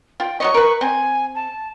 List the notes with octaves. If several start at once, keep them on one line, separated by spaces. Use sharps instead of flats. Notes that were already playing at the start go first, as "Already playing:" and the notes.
F4 G5
F#3 C#5 D#5 C#6
A#4 B4
C4 G#5
A5